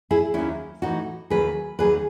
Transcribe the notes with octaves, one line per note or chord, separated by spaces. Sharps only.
E4 G#4
D#2 D#3 F#3 C#4 E4
A2 E3 D#4 F#4
D#2 D#3 F#3 G#4 B4
D#2 D#3 F#3 G#4 B4